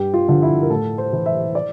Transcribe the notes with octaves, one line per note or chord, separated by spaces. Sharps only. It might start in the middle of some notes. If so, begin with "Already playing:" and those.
Already playing: G2 G4
F4
D3 F3
E4
A#4
A2 A4
C5
E3
E5
D5